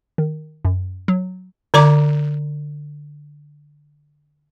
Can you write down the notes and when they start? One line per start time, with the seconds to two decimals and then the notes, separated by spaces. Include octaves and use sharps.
0.18 D#3
0.65 F#2
1.08 F#3
1.74 D3 D5 A#5 D6